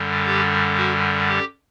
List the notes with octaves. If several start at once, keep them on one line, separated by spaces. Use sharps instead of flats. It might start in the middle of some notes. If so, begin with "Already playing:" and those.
Already playing: F#2 D3 G3
G4
F#4
G4